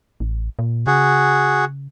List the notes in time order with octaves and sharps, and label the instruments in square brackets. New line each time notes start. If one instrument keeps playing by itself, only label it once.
[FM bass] A1
A#2
[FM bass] C#3 [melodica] F#4 G#4